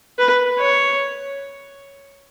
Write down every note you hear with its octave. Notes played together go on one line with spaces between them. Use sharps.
B4
C#5